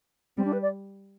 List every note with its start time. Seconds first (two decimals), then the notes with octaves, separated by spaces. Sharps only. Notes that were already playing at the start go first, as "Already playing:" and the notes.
0.37 G3 C4
0.45 D4
0.53 B4
0.62 D5